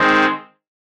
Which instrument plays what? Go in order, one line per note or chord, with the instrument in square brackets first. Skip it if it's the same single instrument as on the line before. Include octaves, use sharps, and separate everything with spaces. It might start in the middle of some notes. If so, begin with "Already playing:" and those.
Already playing: [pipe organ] D#3 G#3 C4